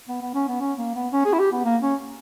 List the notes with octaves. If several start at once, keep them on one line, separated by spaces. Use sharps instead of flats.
B3
B3
C#4
B3
C#4
A#3
B3
C#4
G#4
E4
G4
B3
A#3
C#4